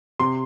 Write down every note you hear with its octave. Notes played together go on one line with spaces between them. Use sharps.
C3 C6